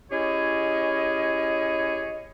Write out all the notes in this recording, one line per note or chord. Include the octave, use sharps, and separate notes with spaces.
C#4 E4 G4 G#4 C#5 D#5